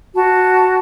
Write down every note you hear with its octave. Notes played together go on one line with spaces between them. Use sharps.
F#4 A5